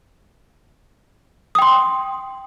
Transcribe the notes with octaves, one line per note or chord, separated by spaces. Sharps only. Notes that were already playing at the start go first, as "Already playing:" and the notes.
G5 C6 D#6